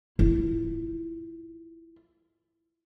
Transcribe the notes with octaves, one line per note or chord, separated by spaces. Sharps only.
E4 F4